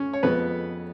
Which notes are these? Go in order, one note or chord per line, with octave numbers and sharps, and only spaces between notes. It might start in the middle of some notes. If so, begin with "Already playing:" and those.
Already playing: C#4
C#5
F2 F3 G#3 B3 B4